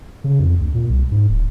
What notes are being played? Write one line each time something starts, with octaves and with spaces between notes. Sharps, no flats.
C#3
F2
D2
A#2
C2
G#2
D1